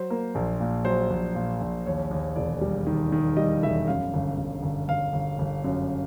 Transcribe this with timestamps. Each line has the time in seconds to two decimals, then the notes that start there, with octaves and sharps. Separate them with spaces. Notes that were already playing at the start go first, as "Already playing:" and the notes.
Already playing: F#3 C5
0.10 A#3
0.35 A#1
0.60 A#2
0.85 F#3 C5
1.10 A#1
1.35 A#2
1.61 A#1
1.86 D#2 C#5
2.11 D#2
2.36 E1 D5
2.61 G3
2.87 D#3
3.12 D#3
3.37 G3 D#5
3.63 E1 E5
3.88 F#2 F5
4.13 G1
4.37 G1
4.63 G1
4.88 G1 F5
5.13 G1
5.39 G1
5.64 F#2